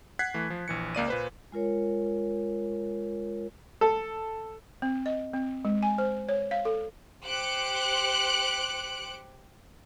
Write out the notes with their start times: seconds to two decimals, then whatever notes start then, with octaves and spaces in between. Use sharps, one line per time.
0.19 F#5 F#6 G#6 B6 C7
0.34 E3 A3
0.50 F3
0.68 A#1 E3 C#7
0.95 C#2 A#3 D5 D#7
1.08 A#2 B4 C5
1.52 G#3 F4 A#4 C#5
3.81 A4
4.82 C4
5.06 D#5
5.34 C4
5.65 G#3
5.83 G#5
5.98 C5
6.29 C#5
6.51 F5
6.65 A4
7.25 G4 C5 F#6 C#7 D7